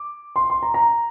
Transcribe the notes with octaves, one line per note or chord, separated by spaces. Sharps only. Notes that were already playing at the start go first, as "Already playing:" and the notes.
Already playing: D6
C6
C6
A#5
A#5